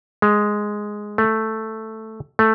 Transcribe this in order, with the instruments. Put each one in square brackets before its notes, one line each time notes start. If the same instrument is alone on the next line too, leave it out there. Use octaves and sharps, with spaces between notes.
[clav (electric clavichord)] G#3
A3
A3